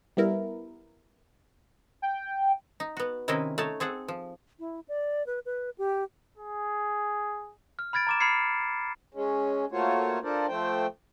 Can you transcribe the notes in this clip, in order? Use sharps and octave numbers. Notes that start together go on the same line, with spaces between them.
G3 B3 E4 A#4
G5
D#4
B3 F#4
C3 D#3 C4 C#4 E4 D#5
A3 D#4 C#5 A5
C4 G#4 A4 F#5
F3
E4
D5
B4
B4
G4
G#4
F6
B5 F6 G#6 A6 D7
A#5 D6 E7
B5 F6 G#6 C7 C#7
G#3 C#4
A3 A#3 F4 F#4 C5 C#5
D4 F4 A4 A#4 C5 D5
F3 A3 C5 G5